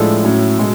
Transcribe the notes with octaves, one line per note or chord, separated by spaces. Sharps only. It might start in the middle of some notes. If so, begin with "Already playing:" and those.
Already playing: A2 F3 G#3 D4 A4
A2 F#3 C#4
B2 G#3